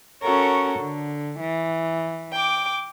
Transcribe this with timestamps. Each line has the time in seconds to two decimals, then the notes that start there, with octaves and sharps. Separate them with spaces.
0.22 C#4 F#4 A4 A#4 C#5
0.80 D3
1.40 E3
2.32 G5 D6